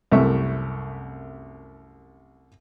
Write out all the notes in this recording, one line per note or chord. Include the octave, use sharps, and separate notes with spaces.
C2 F#2 C3 A3 E5 C#6